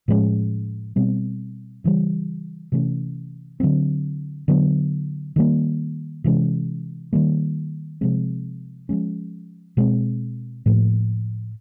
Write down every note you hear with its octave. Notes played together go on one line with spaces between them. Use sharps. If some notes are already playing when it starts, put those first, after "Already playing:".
A2 F3 G#3 C#4
B2 G3 C4
C#3 E3 G3
C3 E3 A3 C#4
D3 F#3 A3 C4
D3 F#3 B3
D#3 G3 A#3
C3 E3 G#3 C#4
D#3 G3 A#3
C3 F3 G#3 C4
F3 G#3 C#4
B2 G#3 C4
A2 F3 A#3